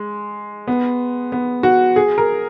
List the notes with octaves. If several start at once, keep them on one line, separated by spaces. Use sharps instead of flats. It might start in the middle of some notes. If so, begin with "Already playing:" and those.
Already playing: G#3
B3
B3
F#4
G#4
A#4